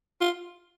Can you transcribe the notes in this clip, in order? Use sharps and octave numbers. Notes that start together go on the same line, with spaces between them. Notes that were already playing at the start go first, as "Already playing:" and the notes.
F4